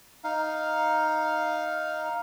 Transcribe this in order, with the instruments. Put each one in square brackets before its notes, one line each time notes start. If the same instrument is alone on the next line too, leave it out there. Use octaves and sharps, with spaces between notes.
[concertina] D#4 F5